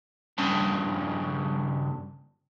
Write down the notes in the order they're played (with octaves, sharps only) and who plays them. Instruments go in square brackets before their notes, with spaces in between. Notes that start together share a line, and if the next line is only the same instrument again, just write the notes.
[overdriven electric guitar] G2 C#3